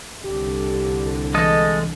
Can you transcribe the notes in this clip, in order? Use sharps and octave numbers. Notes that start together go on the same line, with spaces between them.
C2 D3 G4
E3 G#3 A4 D#5